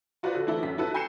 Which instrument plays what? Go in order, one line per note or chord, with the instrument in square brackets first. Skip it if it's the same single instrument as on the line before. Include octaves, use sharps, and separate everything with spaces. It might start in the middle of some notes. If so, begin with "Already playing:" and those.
[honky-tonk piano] F4 F#4 B4 C5 D5
D3
E3 A3 E4 A4
F#2 B6
E4 F#4 A4 B4
G#5 B5 G6 C7 C#7 E7